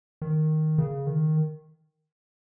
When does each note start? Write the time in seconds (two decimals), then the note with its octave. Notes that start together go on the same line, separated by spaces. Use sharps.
0.22 D#3
0.78 C#3
1.07 D#3